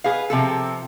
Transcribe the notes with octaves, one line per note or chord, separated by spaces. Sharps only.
G#4 B4 F5
C3 F3 A4